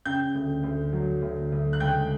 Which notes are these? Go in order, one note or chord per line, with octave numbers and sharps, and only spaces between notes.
C#3 G5 G6
D2
D2
F#3
D2
D2
F#6
C#2 G5 G6